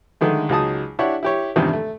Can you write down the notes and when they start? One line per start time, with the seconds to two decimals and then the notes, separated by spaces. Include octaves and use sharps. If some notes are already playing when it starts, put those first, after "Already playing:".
0.21 D3 D#3 G#3 A3
0.49 C#2 F#3 D#4 G#4 A5 D#6
0.99 D4 E4 G4 C#5 F#5
1.23 E4 G4 C#5
1.56 E2 G2 C3 D#3 F3
1.73 A3